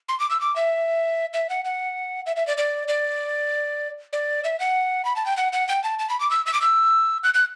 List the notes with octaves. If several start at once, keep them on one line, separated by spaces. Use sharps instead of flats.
C6
D6
E6
D6
E5
E5
F#5
F#5
E5
E5
D5
D5
D5
D5
E5
F#5
B5
A5
G5
F#5
F#5
G5
A5
A5
B5
D6
E6
E6
D6
E6
F#6
F#6